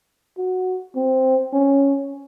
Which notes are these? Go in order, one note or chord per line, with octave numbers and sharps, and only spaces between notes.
F#4
C4
C#4